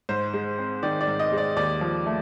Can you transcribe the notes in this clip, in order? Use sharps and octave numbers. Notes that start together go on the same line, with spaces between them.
G#2 C5
G#3
C4
D#3 D5
D5
G#2
D#5
G#3
D5
D#2 D5
F3
A3